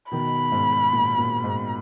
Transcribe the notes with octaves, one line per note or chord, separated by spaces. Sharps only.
B2 D#3 B5
G#2
A#2
A#2
G#2